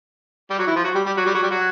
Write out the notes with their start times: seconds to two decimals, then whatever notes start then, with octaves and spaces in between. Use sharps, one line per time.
0.50 G3 G4
0.59 F#3 F#4
0.67 E3 E4
0.76 F3 F4
0.84 F#3 F#4
0.95 G3 G4
1.06 G3 G4
1.17 F#3 F#4
1.26 G3 G4
1.34 F#3 F#4
1.42 G3 G4
1.51 F#3 F#4